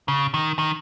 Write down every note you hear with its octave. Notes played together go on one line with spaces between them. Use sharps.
C#3
D#3
D#3